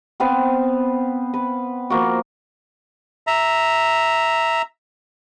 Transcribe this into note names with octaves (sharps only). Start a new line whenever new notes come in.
B3 C4 B4 F5
B4
F3 A#3 F#4
E5 A#5